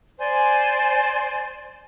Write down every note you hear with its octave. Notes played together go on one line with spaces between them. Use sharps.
C5 D5 G#5 C6